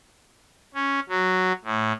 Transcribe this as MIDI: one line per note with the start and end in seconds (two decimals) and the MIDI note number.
0.74 1.00 61
1.09 1.52 54
1.65 1.93 45